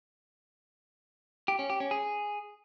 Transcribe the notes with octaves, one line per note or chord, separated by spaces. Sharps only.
G4
C#4
G4
C#4
G#4